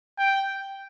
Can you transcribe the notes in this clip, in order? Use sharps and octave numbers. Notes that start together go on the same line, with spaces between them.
G5